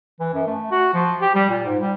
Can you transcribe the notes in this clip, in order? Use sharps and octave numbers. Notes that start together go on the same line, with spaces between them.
E3
F#2
A3
F#4
F3
G4
G3
A#2
G#2
G3